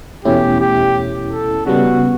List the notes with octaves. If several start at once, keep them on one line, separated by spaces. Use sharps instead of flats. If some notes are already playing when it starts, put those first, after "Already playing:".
E2 B2 A3 C#4 E4 G4
G4
A4
C#3 G3 B3 F#4